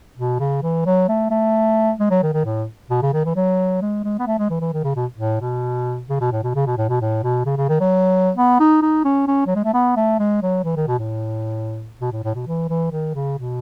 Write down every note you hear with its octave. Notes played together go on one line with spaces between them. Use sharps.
B2
C#3
E3
F#3
A3
A3
G#3
F#3
D#3
D#3
A2
B2
C#3
D#3
E3
F#3
G#3
G#3
B3
A3
G#3
E3
E3
D#3
C#3
B2
A2
B2
C#3
B2
A2
B2
C#3
B2
A2
B2
A2
B2
C#3
C#3
D#3
F#3
B3
D#4
D#4
C#4
C#4
F#3
G#3
A3
B3
A3
G#3
F#3
E3
D#3
B2
A2
B2
A2
A2
B2
E3
E3
D#3
C#3
B2